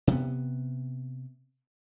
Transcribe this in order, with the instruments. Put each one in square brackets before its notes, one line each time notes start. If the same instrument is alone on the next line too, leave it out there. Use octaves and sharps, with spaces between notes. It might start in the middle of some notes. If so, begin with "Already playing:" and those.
[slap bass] C3 B3